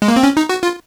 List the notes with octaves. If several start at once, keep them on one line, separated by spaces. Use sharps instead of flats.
G#3
A#3
C4
C#4
D#4
F#4
F4